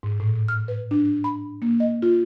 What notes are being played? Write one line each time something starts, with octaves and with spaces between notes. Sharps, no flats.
G#2
A2
F6
B4
D4
B5
A#3
D#5
F4